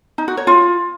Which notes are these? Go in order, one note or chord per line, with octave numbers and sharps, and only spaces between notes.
D#4
F#4
C#5
F4